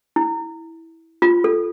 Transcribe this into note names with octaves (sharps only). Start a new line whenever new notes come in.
E4
F4
A4